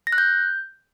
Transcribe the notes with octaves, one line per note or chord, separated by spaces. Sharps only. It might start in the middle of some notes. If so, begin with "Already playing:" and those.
A#6
F#6
G6